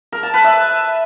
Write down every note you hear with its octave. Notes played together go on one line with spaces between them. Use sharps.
A#4
A5
B4
E5